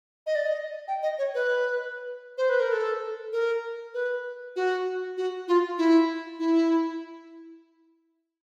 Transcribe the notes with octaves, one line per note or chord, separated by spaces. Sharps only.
D#5
D5
D#5
G5
D#5
C#5
B4
C5
B4
A#4
A4
A#4
B4
F#4
F#4
F4
E4
E4